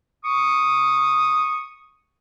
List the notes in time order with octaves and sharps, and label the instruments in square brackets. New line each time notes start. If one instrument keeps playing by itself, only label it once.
[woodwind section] C#6 D#6